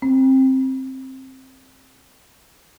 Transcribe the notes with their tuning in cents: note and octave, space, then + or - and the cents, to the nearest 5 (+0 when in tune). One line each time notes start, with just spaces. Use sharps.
C4 +15